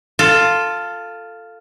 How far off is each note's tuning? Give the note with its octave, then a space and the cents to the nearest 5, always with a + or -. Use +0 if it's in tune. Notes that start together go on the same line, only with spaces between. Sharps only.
F4 +0 A4 +15